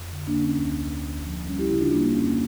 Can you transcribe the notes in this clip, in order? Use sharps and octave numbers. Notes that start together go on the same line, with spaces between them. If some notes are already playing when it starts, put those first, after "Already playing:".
Already playing: F2
D3
A#3 D4
D3
C#4
D2 C#4
D2
D2
F3
G3 C#4
E4 G4
C#3 E4 G4
D4 F4
G3 A#3 D4
A#3
F2 C#4
A#3